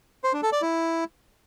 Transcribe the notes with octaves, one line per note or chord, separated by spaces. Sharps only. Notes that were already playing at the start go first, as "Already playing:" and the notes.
C5
D4
A4
D5
E4